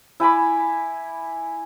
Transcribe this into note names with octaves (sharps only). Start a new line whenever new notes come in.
E4 G#5 B5 D6